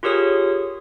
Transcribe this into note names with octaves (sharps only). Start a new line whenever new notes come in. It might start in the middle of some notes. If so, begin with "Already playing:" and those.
F4 G4 G#4 A#4 C#5 D#6